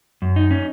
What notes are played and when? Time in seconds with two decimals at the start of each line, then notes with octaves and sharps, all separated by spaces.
0.22 F#2
0.36 D#4
0.51 C#4